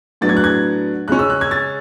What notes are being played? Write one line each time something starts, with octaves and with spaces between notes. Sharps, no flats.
A2 F#3 B3 D4 A6
G#6
F#6
G#6
C#3 G#3 C#4 F#6
E6
F#6
G#6
A6